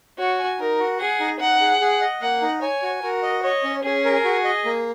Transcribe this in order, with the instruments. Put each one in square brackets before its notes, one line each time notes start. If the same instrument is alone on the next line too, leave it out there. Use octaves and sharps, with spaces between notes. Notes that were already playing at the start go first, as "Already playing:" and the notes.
[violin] F#4 [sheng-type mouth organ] C#5
[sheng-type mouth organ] G#5
[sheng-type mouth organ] D#4 [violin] A#4
[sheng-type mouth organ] F#4
[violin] G#4 [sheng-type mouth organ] F#5
[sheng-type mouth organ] D#4
[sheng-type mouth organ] D#4 [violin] F#5
[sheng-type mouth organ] G#4
G#4
D#5
[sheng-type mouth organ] A#3 [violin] F#5
[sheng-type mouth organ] D#4
[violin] C#5 [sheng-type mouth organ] G#5
[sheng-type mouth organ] F#4
[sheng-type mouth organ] F#4 [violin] A#4
[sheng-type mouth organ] D#5
[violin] C#5 [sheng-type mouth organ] D#5
[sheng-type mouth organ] C#4
[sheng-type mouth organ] C#4 [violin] G#4
[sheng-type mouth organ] A#4
F#4
D#5
A#3